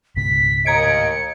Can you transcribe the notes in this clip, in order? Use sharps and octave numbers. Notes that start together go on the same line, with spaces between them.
C#2 G#2 B2 B6
D#2 A2 D#5 A#5 G#6 C#7 D7